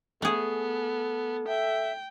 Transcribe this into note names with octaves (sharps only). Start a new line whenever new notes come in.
A3 B3 G#4 A4
E5 G5